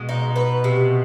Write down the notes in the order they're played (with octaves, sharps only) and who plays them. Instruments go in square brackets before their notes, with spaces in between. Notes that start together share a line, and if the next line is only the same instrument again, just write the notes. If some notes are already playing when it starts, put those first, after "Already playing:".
Already playing: [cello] B2 [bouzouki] G#3
[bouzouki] D#4
B4
C3